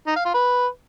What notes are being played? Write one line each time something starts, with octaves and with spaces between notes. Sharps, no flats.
D#4
F5
F4
B4